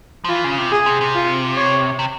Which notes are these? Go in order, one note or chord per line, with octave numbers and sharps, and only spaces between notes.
F3
E3 F4
C#3
C3
G#4
C3
C3
F4
C#5
C3